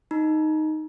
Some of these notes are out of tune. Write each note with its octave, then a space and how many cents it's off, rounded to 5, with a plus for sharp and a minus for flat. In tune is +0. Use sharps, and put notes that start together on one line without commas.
D#4 +0 A#5 +40